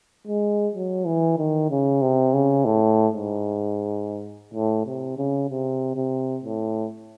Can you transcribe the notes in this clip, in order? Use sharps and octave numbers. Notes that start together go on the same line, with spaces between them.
G#3
F#3
E3
D#3
C#3
C3
C#3
A2
G#2
A2
C3
C#3
C3
C3
A2